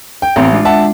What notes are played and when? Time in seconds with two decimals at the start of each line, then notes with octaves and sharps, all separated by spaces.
0.22 G5
0.36 A1 B3 C4 A#5
0.53 G#3 D4 F4
0.65 E5 F#5 A5